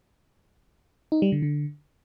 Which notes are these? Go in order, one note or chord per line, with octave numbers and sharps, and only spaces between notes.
D#4
G3
D3
D3